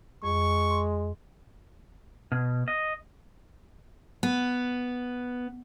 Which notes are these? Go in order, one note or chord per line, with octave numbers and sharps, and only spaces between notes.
F2 G#3 C#6
C6
B2
D#5
B3